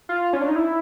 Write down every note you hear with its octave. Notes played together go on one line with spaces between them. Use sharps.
F4
C#4
D4
D#4
E4